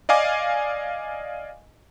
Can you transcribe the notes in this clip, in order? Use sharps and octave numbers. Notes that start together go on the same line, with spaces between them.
D5 D#5 F5 G#5 D6